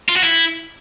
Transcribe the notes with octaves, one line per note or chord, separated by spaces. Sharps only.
F4
F#4
E4